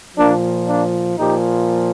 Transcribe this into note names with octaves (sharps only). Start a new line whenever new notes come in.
A#2 F3 A#3 D4
A#3 D4
A#2 F3 D#4 G4